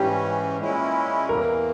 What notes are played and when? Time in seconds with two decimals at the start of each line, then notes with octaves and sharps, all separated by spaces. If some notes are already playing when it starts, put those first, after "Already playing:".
Already playing: G#2 E3 G3 C#4 G4
0.59 A#2 G#3 C#4 E4
1.29 E2 E3 G3 A#3 A#4